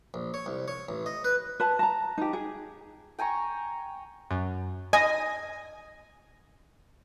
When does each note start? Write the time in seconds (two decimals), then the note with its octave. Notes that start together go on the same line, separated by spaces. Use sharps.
0.14 A#1
0.34 C#5
0.46 C2
0.68 C#5
0.89 A1
1.06 D#5
1.24 B4
1.60 B4 A5
1.79 A5 A#5
2.18 D#4 G4
2.33 G#4
3.19 G5 G#5 A#5 C#6
4.31 F#2
4.93 D#5 G#5